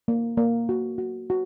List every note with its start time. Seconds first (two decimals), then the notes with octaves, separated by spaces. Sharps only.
0.08 A#3
0.37 A#3
0.69 F#4
0.98 F#4
1.30 F#4